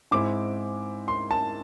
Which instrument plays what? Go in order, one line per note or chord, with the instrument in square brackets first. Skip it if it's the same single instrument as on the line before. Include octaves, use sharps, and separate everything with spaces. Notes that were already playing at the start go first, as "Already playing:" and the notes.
[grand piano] G#2 G#3 C4 E4 D6
C6
A5